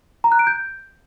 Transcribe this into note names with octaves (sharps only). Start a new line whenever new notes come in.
A#5
F#6
D7
G6